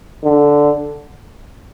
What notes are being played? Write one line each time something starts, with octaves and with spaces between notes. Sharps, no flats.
D3